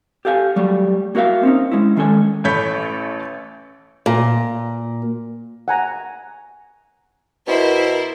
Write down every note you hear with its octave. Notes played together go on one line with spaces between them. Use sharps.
G4 A4 F5 F#5 G#5
F#3 G3 A3
A#3 F#4 A#4 E5 F5
C4 C#4 D#4
G#3 C#4 E4
D#3 G#3 C#4 A4 G#5
A1 A3 C#5 B5 G6 B6
A#2
F#5 G#5 A#5
B2 E4 A#4 C5